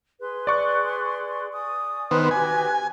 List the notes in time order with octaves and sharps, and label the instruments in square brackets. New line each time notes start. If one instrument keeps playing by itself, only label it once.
[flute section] G#4 C6 [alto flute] B4
[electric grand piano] D5 C#6 F#6
[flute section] G#5 D#6
[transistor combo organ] D#3 B3 C5 [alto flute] B4
[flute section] F#4 G4 D6 [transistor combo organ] G#5